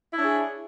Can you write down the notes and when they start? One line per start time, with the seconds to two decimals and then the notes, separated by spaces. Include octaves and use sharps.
0.13 E4
0.17 D4
0.20 C#5
0.24 G#4